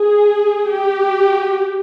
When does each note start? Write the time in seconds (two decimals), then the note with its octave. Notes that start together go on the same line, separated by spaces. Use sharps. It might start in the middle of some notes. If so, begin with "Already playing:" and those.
Already playing: G#4
0.71 G4